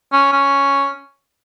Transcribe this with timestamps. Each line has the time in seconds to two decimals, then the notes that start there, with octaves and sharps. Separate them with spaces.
0.12 C#4
0.32 C#4